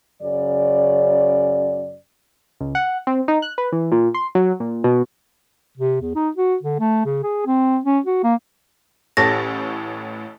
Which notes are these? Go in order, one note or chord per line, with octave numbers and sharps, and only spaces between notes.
F#2 C#3 D5
C#2
F#5
C4
D#4
F#6
B4
E3
A#2
C6
F#3
A#2
B2
C3
E2
D#4
F#4
D3
A3
C#3
G#4
C4
C#4
F#4
A#3
A1 A2 G4 A4 C#5 A6 A#6